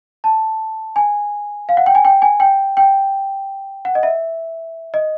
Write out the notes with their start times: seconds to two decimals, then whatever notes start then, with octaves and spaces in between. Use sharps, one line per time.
0.24 A5
0.96 G#5
1.69 F5
1.77 F#5
1.86 G5
1.95 G#5
2.05 G5
2.22 G#5
2.40 G5
2.77 G5
3.85 F#5
3.95 D#5
4.03 E5
4.94 D#5